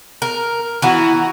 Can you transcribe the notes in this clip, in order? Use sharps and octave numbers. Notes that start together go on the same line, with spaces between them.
A#4
E3 B3 E4 F#4 A#5